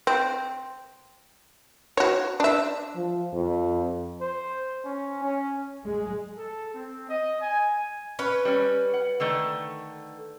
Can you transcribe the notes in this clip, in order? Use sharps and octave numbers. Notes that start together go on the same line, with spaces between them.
C4
F#4 C#5
D4 E5
F3
F2
C5
C#4
C#4
G#3
A4
C4
D#5
G#5
C#4 B4
G3 C#4
F#5
D3 D#3 A3